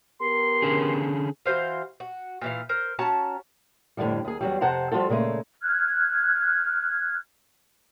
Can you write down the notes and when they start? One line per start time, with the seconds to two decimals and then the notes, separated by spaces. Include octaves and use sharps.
0.20 B3 G4 A#4 C6
0.62 D3 C#4 G#4
1.46 E3 F#4 C5 F5
2.00 F#4
2.42 A#2 E3 F5
2.69 A#4 C5
2.99 C#4 F#4 A5 A#5
3.97 F2 A2 D3 D#3 F3 G3
4.25 D#2 G#4
4.41 E2 F#3 G3
4.61 F2 C3 C5 F#5 A5 A#5
4.91 F3 G3 F4 F#4 A4
5.09 A#2 C#3 G#3 A3
5.62 F6 F#6 G#6